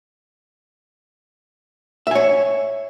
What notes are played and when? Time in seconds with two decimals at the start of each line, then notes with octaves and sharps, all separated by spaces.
2.07 E5
2.11 G#5
2.15 C#5